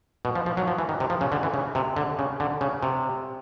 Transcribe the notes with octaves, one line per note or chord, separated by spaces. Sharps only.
B2
F3
F3
F#3
F3
E3
D#3
C3
F3
C#3
D3
E3
C#3
C3
D3
C#3
D3
C#3
C3